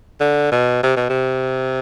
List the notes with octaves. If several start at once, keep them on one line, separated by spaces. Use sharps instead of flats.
D3
B2
C3
B2
C3